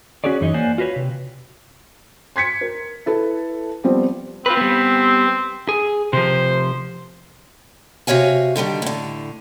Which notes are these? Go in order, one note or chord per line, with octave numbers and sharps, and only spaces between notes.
C#4 F#4 G#4 C#5 D5
F#2 E3 D#4 C#5 D#5
A#3 C5 D5 F#5 G#5
F4 F#4 B4 C#5
C3
C6 G#6 B6 C#7
A#4
E4 A4 B4
F3 G3 B3 C4 F4
C4 F4 B4
G3 B3
G#4
C3 F3 C5
C3 F#4 C#5 F5 G#5
D3 D#3 G3 D4
A2 D3